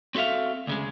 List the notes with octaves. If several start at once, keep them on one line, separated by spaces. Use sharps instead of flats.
C4 F#4 A4 E5 F5
D2 C#3 G#3